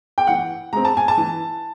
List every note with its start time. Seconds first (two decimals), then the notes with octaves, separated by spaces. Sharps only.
0.18 G5
0.27 E3 F#5
0.73 G#3 C4 A#5
0.85 A5
0.97 G#5
1.08 A5
1.17 E3